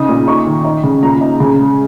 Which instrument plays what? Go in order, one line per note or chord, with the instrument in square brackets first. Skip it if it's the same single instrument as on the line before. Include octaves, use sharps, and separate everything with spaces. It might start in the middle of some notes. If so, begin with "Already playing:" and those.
Already playing: [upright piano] C#3 D#4 D#6
A#2
D#4 C#6
D#3
D#4
C#3
A#2 A#5
D#4
C#3
G#3